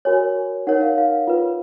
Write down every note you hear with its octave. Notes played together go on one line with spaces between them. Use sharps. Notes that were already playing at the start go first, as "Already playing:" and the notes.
F#4 A#4 C#5 G#5
D#4 A#4 C#5 F#5
F5
F5
F4 B4